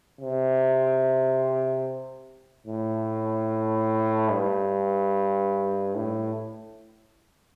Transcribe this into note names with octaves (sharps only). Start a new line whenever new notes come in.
C3
A2
G2
A2